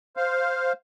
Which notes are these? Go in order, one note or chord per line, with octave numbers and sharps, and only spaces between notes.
C5 F5